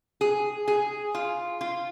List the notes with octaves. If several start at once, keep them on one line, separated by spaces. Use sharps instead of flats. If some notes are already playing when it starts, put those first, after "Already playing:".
G#4
G#4
F4
F4